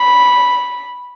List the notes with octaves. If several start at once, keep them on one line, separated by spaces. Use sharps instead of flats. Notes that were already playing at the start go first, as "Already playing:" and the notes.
Already playing: B5